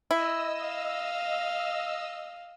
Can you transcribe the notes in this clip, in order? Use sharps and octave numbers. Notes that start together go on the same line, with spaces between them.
E4 D#5 E6
F5